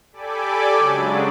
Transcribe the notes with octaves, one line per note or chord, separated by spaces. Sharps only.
G4 A4 D5 G#5 B5 D6
C#3 F#3 G#3 D4